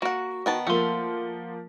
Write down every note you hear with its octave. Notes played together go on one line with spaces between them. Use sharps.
A#3 F#4 F#5
D#3 B3 A5
F3 A3 A#3 F#5 C6